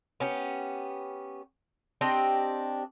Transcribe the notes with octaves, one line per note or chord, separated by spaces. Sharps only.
B3 C#4 G4
C4 D4 G4 D#5